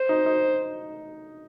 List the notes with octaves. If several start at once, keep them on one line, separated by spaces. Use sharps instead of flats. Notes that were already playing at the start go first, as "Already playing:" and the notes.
Already playing: C5
D#4
D#4